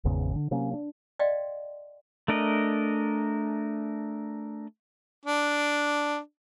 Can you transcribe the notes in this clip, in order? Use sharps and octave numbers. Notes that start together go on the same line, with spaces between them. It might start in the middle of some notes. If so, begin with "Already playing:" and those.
G#1 E2 C#3
D3
C3 F#3 A#3 C#4
D4
D5 D#5 F5 G5 C6
A3 D4 A#4 D#5
D4